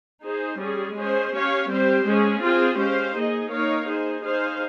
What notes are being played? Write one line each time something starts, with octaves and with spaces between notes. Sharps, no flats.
D#4 G#4 C5
G3 C#4 G#4
G#3 C#4 G#4 C5
C#4 G4 C#5 F5
G3 C4 G4 C5
G#3 C#4 G#4
C4 F4 G#4 C5
G#3 C#4 G4 C5 F5
A#3 D#4 G#4 D#5
A#3 D#4 A#4 C#5 F5
D#4 G#4 C5
D#4 G#4 C5 F5